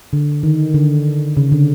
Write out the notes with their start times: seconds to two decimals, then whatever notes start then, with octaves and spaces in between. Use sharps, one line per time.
0.13 D3
0.43 D#3
0.74 D3
1.37 C#3
1.52 D3